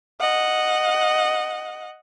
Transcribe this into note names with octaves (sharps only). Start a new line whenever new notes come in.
D#5 F#5